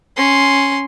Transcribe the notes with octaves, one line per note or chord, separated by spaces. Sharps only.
C#4 C6